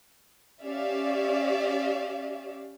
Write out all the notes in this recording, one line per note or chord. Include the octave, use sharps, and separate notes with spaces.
C#4 G4 C#5 D5 E5 F5